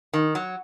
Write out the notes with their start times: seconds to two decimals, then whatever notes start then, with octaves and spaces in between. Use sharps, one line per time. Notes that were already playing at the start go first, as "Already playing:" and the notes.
0.13 D#3
0.35 F#3